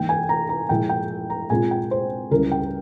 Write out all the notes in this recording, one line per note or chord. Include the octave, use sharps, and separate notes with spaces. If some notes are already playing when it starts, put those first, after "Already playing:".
Already playing: G#2 E3 A#3 G5
G#5
A#5
A#5
A#2 F3 G#3 E4 G5
G5
A#5
A#2 G#3 C4 F4 G#5
G5
C5
C#2 C#3 G3 C#4 E4 A#4
G5